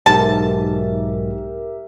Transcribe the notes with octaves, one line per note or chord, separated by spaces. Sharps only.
B1 G#2 G4 A#4 E5 A5